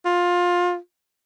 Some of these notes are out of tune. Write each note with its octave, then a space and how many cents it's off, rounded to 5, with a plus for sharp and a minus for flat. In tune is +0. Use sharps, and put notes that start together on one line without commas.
F4 +20